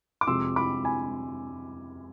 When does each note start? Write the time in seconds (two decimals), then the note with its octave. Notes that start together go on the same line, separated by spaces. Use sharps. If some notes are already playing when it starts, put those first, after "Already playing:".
0.21 D6
0.27 F2 C3 F3 G#3 C6 E6
0.56 B5 D6
0.85 G#5 B5